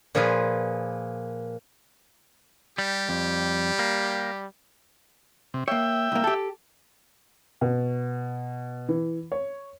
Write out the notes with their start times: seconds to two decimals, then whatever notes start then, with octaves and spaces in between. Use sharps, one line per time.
0.15 A#2 F3 F4 G#4 B4 F5
2.78 G3 G4
3.09 F2 G3
3.79 A#3
5.54 C3
5.68 A#3 C#5 E5 G5
6.12 C2 A#3
6.24 G4 A4
7.61 B2
8.89 E3
9.32 C#5